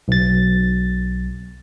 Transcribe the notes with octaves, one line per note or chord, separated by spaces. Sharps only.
B1 A6